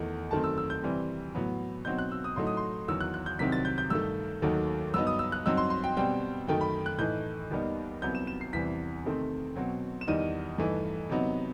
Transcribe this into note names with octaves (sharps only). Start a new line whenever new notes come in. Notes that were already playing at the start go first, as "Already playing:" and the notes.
Already playing: E2 D#3 A3 D#4
F#2 D#3 A3 C4 A5
E6
E6
G6
C3 E3 G3 C4
A2 F#3 B3
B2 F#3 C4 D#4 G6
F#6
E6
D#6
A2 F#3 A3 D#4 C6
D#6
C6
E2 D#3 F#3 E6
F#6
F#6
G6
C2 C3 D#3 F#3 C4 B6
A6
G6
G6
G2 D#3 A3 E6
D#2 D#3 F#3 A3
G2 F#3 B3 D#4 E6
D#6
E6
F#6
G2 F#3 C4 D#4 E6
C6
C6
G5
B2 G3 C4 G5
F#2 D#3 A3 G5
B5
F#6
A2 E3 A3 D#4 G6
D#2 D#3 G3 B3 D#4
C2 C3 F#3 B3 G6
E7
E7
C7
E2 C3 E3 G3 B6
C3 D#3 A3 C4
B2 F#3 C4
E7
E2 D#3 G3 D#4 D#7
G2 E3 A3 D#4
C3 F#3 B3 D#4